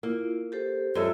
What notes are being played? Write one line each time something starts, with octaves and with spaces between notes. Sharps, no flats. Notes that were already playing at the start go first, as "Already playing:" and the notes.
A#3 E4 F4
G4 A4 C5
F#2 G#3 F4 A4 E5